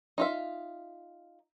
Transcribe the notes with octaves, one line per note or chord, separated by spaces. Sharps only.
D#4 F4 E5